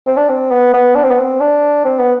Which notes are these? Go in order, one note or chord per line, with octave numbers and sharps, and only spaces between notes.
C4
D4
C4
B3
B3
D4
C4
B3
C4
D4
C4
B3